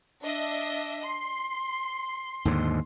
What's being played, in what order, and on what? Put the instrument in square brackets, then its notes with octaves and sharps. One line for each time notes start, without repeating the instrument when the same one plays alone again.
[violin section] D4 D#5 E5
C6
[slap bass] D#2 G#2 D3